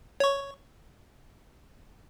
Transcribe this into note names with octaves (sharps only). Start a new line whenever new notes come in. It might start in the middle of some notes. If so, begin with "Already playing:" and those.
C#5 C#6